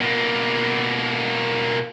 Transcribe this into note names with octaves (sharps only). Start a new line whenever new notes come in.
B2 A#3